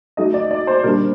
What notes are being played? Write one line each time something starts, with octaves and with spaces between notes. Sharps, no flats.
F#3 A3 D#4 D#5
D5
D5
C5
A#2 G3 D4 A#4